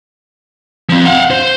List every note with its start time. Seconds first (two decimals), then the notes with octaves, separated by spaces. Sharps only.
0.90 F3 C4
1.06 F5 F#5
1.31 C5